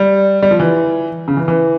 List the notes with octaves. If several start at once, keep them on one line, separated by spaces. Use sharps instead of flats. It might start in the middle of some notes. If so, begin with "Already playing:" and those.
Already playing: G3
G3
F3
E3
C#3
E3
E3